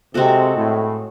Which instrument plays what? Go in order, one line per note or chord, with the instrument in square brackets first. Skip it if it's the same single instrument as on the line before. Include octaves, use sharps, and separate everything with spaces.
[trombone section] C3 [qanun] G#3 C4 F#4 A4
[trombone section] A2